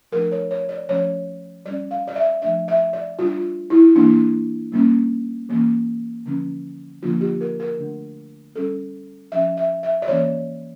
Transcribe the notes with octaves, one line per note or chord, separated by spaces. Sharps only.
F3 A3 D4 A#4
C#5
C#5
D5
F3 A3 C#4 C#5
G3 C#4 D5
F5
D5
E5
F3 A3 D4 E5
E5
D5
G3 D4 F4
E4
E3 A#3 D4
G3 A#3 C#4
E3 A#3 C#4
D3 F3 C#4
D3 F3 A#3 D4 F4
G4
A#4
A#4
D3 A3 D4
G3 C#4 A4
F3 C#4 E5
E5
E5
D5
E3 A#3 C#4 C#5